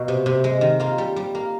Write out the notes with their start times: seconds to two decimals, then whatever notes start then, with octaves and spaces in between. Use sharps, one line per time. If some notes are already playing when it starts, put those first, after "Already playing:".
Already playing: B2 A#3
0.08 C3
0.26 C3
0.44 G#3
0.61 D#3
0.80 A#3 F4
0.98 G3
1.16 G3
1.35 A#3